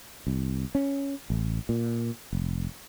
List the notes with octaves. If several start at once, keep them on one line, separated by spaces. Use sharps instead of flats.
C2
C#4
A1
A#2
F1